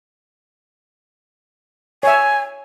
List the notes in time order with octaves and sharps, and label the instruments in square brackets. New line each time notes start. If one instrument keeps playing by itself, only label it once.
[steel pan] C#5 E5 [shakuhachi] G#5